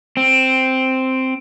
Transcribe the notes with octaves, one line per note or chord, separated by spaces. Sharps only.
C4